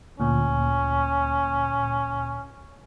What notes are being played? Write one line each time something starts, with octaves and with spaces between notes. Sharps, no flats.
D2 A#2 C#4